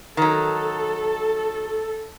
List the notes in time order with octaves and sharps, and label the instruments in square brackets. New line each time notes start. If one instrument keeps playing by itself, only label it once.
[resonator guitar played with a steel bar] D#3 F#3 [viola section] A4